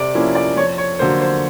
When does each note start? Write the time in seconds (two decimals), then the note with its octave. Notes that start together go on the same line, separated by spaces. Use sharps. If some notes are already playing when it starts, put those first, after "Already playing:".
Already playing: C3 D5
0.15 F3 A#3 C#4 E4
0.35 D5
0.56 F2 C#5
0.78 C#5
0.99 D3 F#3 A#3 C5
1.21 C5